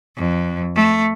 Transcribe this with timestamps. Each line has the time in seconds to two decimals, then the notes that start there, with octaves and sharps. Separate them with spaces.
0.17 F2
0.75 A3